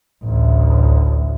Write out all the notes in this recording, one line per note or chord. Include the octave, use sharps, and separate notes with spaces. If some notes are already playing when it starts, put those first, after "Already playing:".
A1 D2